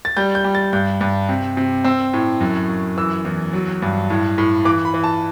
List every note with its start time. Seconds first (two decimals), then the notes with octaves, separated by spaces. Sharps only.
0.05 A6
0.17 G3 G6
0.35 G6
0.44 G3
0.55 A6
0.73 G2 G6
1.01 G2
1.29 C3
1.57 C3
1.84 C4 E6
2.13 A2
2.41 F#2
2.69 F#2
2.97 E3 E6
3.25 E2
3.53 F#3
3.82 G2
4.10 A2
4.38 A2
4.65 E3 D6
4.85 B5
4.94 E3
5.04 A5